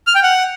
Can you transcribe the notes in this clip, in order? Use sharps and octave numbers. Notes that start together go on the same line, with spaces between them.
F6
G5
F#5